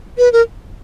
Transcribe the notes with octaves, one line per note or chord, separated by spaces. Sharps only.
B4
A#4